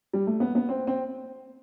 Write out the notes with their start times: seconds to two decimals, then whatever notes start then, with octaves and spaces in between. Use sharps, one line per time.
0.13 G3
0.27 A3
0.40 B3
0.55 B3
0.69 C4
0.87 C4